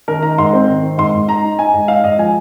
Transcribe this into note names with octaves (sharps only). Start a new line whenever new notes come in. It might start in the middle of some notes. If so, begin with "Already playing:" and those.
D#3 A#4
D#4 A#5
G#2 C6
C4
D#3
D#4
G#2 C6
G#2
D#4 A#5
D#4
D#4 G#5
G#2
D#4 F5
G#2 D#5
F3 G#5